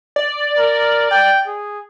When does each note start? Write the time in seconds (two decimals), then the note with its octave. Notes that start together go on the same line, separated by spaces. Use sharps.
0.16 D5
0.58 A#4
1.11 G5
1.47 G#4